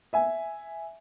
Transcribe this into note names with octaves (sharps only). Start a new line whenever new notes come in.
E5 G#5